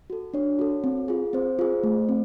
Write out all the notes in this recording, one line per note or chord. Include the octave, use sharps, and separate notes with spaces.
F#4 A4
D4 C#5
F#4 A4
C4
F4 G#4
C4 C5
F4 G#4
A3
C4